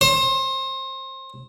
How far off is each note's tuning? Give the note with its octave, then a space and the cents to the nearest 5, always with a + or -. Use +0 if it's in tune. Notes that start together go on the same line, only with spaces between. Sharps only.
C5 +25